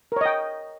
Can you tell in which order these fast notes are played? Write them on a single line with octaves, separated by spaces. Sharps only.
A#4 C#5 D#5 G5